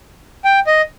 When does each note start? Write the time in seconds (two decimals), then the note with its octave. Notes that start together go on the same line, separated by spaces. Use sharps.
0.45 G5
0.67 D#5